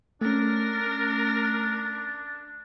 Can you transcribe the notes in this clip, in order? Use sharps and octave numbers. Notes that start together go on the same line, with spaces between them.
A3 C#4 D4 A#4